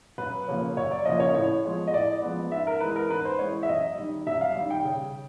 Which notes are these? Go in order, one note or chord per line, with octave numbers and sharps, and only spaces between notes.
F#2 B4
C#3 F3 A#3 C#4
F#2 C#5
D5
C#3 F3 A#3 C#4 D#5
C#5
A2 C#5
F3 G#3 B3
D#5
A2 D5
F3 G#3 B3
G#2 E5
A#4
E3 G#3 B4
A#4
G#2 B4
C5
E3 G#3 C#5
E5
F#2 D#5
D#3 G3
F#2 E5
F5
D#3 G3
G5
C#3